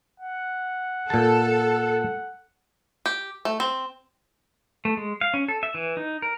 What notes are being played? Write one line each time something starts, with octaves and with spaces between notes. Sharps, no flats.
F#5
A#2 A4 A5
G4
A3
C4
A3
G#3
F5
C#4
A4
E5
E3
D#4
A#4